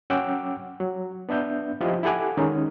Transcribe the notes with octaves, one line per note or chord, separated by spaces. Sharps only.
F#3 C#4 F#5 G5 D6 E6
F#3
B3 D4 E5 G6
F3 E4 F4 G4 C5 D#5
E4 G4 A4 F#5 G#5 D6
D#3 G#3 C#4 D#4